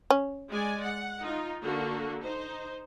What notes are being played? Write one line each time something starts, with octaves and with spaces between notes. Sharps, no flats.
C#4
G#3 D5 G#5
F#5
D#4 F4
D3 A#3 F#4
D#4 C5